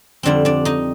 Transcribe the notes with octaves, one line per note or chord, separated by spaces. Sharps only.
F2 D3 G3 C4 D4 D5
D4 D5
D#4 D#5